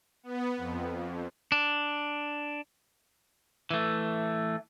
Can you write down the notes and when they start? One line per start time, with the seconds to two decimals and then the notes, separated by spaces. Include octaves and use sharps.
0.23 B3
0.57 F2
1.52 D4
3.71 E3 A3